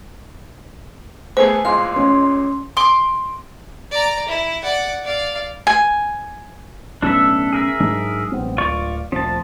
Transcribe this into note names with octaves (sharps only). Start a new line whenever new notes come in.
A3 B3 G#4 C5 G#5
A1 A#2 G#3 F5 C6
C#4
C6 D6
D5 A#5
E4
D5 F#5
D5 F5
G#5
B1 A2 C#4 D4 A4 E5
G#4 A#4 E5
G#2 F#3 G#3 D4
A1 B3 C4
D1 F4 D5 C#6
D2 A#2 F3 C4 A5